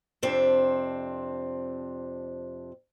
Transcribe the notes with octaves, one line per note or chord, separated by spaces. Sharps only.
F2 C3 C4 D4